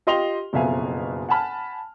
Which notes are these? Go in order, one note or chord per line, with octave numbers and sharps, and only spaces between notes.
F4 G4 D#5 C6 F7 G7
F#1 F2 B2 E5 F5 G#5
F#5 G#5 A5 B5 F6